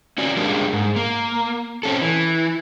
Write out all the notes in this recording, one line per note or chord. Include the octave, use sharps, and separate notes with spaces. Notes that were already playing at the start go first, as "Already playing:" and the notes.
C#4 F#4 D5
G3 G#3 A#3 D4
G#2
A#3
C4 C#4 A4
E3